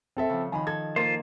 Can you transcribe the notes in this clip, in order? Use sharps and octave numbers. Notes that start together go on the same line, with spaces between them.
C4 A4 E5
C#3 F3
D#3 F3 G#5 B5
A4 G#6
A#3 F4 C5